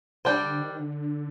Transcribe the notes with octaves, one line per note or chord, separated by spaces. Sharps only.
C3 G3 D4 G4 C5
D3
D#3
D3